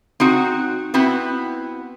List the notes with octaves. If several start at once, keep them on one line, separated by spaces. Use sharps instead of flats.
C4 D#4 F#4
B3 C4 E4 F#4